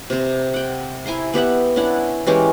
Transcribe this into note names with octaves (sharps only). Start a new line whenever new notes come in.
C3 C4
F#5 G5
E4 G#5 A#5 C6
B3 G4 E5 F#5
C#4 D4 E4 F#5
E3 G#3 C#4 G4